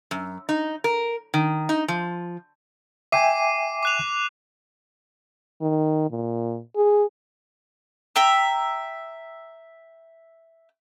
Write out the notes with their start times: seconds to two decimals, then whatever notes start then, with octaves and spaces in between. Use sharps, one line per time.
0.11 F#2
0.49 D#4
0.84 A#4
1.34 D#3
1.69 D#4
1.88 F3
3.12 E5 G5 G#5 D6 C7 D#7
3.83 D6 F#6 F7
5.61 D#3
6.11 A#2
6.76 G#4
8.16 E5 G5 A#5